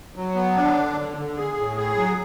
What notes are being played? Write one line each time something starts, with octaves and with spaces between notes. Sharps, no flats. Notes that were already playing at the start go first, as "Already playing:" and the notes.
F#3
B3
D4
D3
D3
D3
G#4
A2
G#4
F#3